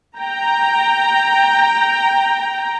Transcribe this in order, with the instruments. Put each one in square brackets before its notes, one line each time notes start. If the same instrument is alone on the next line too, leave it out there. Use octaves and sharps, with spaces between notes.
[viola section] G5 A#5